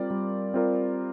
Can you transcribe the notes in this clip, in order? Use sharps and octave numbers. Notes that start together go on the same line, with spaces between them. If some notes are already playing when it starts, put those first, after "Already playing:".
Already playing: G3 C4 F4 A#4 D5
G3
C4 F4 A#4 D5